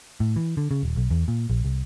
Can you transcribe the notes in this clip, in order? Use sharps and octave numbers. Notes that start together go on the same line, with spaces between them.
A2
E3
D3
C#3
D#1
B1
E2
A#2
A#1
C2